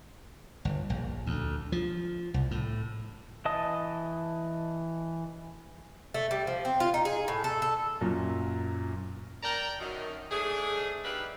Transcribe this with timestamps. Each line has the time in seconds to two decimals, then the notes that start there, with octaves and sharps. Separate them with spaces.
0.65 G1
0.90 A#1
1.26 D2
1.72 F3
2.34 C2
2.51 A2
3.45 E3 D#5 A5 D#6
6.14 A3
6.31 G3
6.47 F3
6.65 C4
6.80 F4
6.94 D#4
7.05 G#4
7.28 A2
7.44 A4
7.62 A4
8.01 F#2 A#2
9.42 A#4 D5 G5 A5 A#5
9.80 F#2 D#3
10.30 G#2 A3 D4 G#4
11.04 D#4 G4 B4 D5 E5 F5